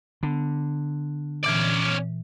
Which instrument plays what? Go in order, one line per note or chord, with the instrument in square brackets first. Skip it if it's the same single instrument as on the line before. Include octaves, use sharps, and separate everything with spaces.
[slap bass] D3 [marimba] B3
[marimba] A#2 E3 [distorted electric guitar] C#4 D5